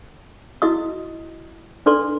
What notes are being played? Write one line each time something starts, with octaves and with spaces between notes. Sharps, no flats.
E4 F#4 D#5 D#6
D4 A4 B4 D5 C6